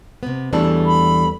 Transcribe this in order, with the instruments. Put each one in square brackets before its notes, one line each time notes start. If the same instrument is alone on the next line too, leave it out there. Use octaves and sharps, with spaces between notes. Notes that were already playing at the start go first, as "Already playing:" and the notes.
[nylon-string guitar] C3 B3
[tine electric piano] E2 G3 A4 [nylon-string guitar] E3 A3 D4
[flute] B5